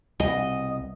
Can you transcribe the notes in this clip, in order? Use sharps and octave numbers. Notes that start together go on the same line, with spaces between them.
C2 B2 D#5